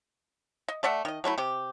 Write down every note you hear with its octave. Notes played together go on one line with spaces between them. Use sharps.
D#5
A3 D5 E5 F#5
D#3 D#5
F#3 A3 C4 E4
C3 G4